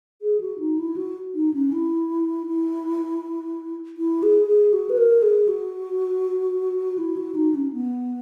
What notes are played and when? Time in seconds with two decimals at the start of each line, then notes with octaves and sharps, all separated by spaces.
0.22 G#4
0.40 F#4
0.59 D#4
0.78 E4
0.96 F#4
1.34 D#4
1.54 C#4
1.72 E4
2.47 E4
3.97 E4
4.23 G#4
4.47 G#4
4.73 F#4
4.90 B4
4.98 A#4
5.22 G#4
5.48 F#4
6.98 E4
7.17 F#4
7.35 D#4
7.55 C#4
7.73 B3